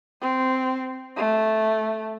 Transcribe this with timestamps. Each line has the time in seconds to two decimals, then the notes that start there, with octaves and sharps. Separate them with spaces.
0.21 C4
1.17 A3